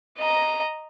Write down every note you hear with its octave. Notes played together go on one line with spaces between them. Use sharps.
D#5 A#5